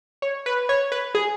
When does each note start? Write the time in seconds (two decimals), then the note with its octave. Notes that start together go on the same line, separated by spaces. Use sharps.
0.22 C#5
0.46 B4
0.69 C#5
0.92 B4
1.15 G#4